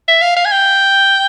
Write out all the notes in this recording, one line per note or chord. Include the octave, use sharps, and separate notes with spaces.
E5
F5
F5
G#5
G5